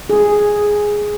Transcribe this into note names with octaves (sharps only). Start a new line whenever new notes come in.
G#4